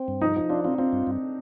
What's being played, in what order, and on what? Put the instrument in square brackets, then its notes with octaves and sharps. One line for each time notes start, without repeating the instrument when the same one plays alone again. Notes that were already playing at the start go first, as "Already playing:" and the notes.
Already playing: [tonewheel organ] C4
G2
[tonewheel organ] F3 [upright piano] D#4
[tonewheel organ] F3 [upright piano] D#4
[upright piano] D4 [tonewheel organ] F4
[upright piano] C4 [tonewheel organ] F4
[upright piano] C4 [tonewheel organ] F4
[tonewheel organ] G2
G2